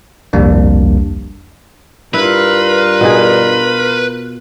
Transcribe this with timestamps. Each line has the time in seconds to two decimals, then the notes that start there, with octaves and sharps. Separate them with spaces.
0.33 G1 C2 F2 G3 A#3 D4
2.14 G2 E4 F4 A#4 B4
3.01 B2 D#4 G#4